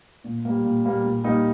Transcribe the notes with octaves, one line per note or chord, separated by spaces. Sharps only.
A#2
G3 A#3
A#2
G3 A#3
A#2
G3 A#3 D#4